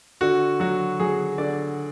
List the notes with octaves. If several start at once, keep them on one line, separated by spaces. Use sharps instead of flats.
D3 F#4
F#3 F#4
F#3 G#4
D3 D5